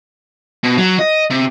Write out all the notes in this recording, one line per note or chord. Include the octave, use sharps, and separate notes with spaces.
B2
F#3
D#5
C3